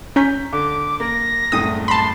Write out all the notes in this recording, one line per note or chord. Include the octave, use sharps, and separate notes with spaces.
C#4 A#5 G6 B6
D3 D6
A#3 A#6
F#1 C2 A2 D#6
A5 B5 C6